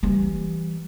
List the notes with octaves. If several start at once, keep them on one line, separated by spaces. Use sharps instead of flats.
E3 G3